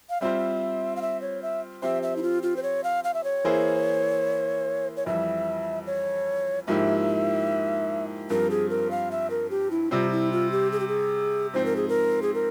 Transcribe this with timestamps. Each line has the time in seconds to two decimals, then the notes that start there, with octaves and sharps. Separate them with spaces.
0.10 F5
0.21 G3 C4 F4 C5 E5
0.96 F5
1.02 E5
1.22 C#5
1.43 E5
1.82 F3 C4 G4 C5 E5
2.03 E5
2.16 E4
2.23 F4
2.43 F4
2.57 C5
2.63 C#5
2.84 F5
3.04 F5
3.14 E5
3.24 C#5
3.44 E3 A#3 E4 G#4 C5
4.97 C#5
5.06 F2 E3 G3 E5
5.87 C#5
6.67 G#2 F3 A#3 E4 G4 E5
8.30 G2 F3 C4 G4 A#4
8.50 G#4
8.70 A#4
8.91 F5
9.11 E5
9.30 A#4
9.50 G4
9.71 E4
9.91 C3 G3 C4 F4
10.12 E4
10.32 F4
10.52 G4
10.72 G#4
10.80 G4
10.88 G#4
11.53 G#2 F3 C4 C5
11.66 A#4
11.76 G#4
11.89 A#4
12.22 G#4
12.34 A#4